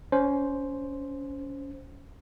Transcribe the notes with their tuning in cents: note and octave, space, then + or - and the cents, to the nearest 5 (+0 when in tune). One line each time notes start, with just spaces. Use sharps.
C#4 +20 C5 +0